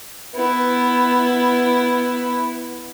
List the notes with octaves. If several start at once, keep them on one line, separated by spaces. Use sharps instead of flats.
B3 E4